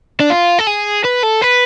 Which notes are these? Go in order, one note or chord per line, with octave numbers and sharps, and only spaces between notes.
D4
F4
A4
G#4
B4
A4
B4